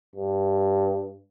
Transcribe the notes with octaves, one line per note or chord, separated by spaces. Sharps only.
G2